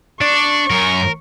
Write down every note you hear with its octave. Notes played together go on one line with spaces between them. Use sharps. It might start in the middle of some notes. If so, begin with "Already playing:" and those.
D4 D5 C#6
F#2 A#4